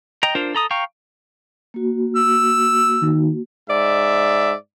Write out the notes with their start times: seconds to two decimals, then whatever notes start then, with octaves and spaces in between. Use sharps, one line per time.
0.23 D#5 G5 A#5
0.35 D4 F4 A#4 C5
0.55 A4 A#5 D#6
0.71 F5 G5 A#5 C#6
1.74 A#3 F#4
2.16 E6
3.02 D#3
3.69 G#2 D5 E5